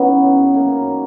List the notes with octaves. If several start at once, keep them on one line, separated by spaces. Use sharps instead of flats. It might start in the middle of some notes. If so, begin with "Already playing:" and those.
Already playing: E3 B3 C#4 D#4
C#3
F#2
F#2
D#3 A#3
F#2